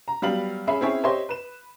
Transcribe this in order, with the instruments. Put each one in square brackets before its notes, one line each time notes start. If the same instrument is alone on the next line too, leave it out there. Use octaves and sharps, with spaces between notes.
[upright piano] A#5
F#3 G3 B3 F5 F#7
C#4 G#4 E5 G#5 B5 C7
C4 C#4 E4 G#4 C#5
G4 C5 C#5 D#5 E5 C6
B4 E7